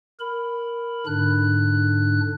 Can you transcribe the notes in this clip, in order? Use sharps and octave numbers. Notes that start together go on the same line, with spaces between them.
A#4 B5
G#2 D3 D4 F#6